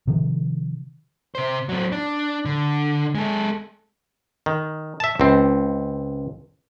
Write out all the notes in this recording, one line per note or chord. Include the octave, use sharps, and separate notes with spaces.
C3 D#3 F3
C3 C5
F#3 C4
D4
D3
G#3 A4
D#3
E5 A5
C#2 C4